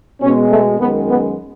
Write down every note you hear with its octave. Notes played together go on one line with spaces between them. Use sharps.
B2 G#3 C#4
A3
F#2 D#3 G#3 B3
B3